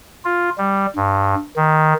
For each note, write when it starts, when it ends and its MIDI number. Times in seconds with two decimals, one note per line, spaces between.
0.25 0.50 65
0.58 0.86 55
0.96 1.35 43
1.56 1.94 51